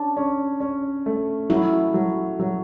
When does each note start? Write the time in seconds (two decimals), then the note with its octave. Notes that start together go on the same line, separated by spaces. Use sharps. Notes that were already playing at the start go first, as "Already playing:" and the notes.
Already playing: C#4 D4
0.17 C#4
0.60 C#4
1.06 A3
1.50 F#3 E4
1.94 F#3
2.40 F#3